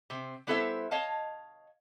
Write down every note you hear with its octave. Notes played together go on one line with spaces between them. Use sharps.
C3 C4
G3 B3 E4 A4 C5 E5
C#5 D#5 F5 A5